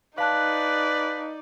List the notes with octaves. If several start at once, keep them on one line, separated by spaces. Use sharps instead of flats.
D#4 B4 D5 F5 A5 F#6